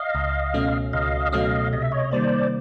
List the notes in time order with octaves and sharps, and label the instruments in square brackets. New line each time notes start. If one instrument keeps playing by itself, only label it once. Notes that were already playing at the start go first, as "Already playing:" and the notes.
Already playing: [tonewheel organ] D#5 F5
[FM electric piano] C#2
B2 F#3 A3 C#4
[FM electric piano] C#2 [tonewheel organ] D#5 F5
[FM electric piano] B2 F#3 A3 C#4 [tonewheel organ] D#5 F5
[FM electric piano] C3 [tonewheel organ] D#5
[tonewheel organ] E5
C#5 D#5
[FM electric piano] D#3 G3 A#3 [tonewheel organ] C5 D5